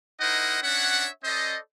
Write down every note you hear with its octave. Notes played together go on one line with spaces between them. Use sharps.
D#4 E4 A#4 C5 D#5 F#5
C#4 D4 C#5 E5 F#5
C#4 A4 C5 D5 D#5